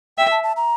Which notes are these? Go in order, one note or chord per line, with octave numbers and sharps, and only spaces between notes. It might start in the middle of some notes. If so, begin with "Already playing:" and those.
E5 G5
A5
A5
A#5